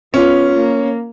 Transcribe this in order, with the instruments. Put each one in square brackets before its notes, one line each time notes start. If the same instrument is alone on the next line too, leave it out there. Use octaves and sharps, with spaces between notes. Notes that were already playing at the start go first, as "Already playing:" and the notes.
[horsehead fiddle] B3 F4 [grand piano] C#4
[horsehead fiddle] A#3